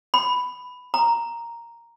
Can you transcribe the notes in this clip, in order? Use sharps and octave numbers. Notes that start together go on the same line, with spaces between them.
B5
A#5